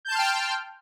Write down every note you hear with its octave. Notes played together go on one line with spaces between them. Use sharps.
G5 A5 C6 F6 G6